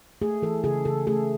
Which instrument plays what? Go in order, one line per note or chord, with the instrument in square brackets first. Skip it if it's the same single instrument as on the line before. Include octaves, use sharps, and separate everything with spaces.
[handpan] A3 G#4
E3 A4
C#3 G#4
C#3 A4
A3 G#4